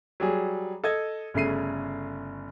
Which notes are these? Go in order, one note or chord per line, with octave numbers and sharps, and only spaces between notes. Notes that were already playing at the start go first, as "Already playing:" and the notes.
F#3 G3 G#4
A4 D#5 G#6
G1 C#3 A3 C7 D#7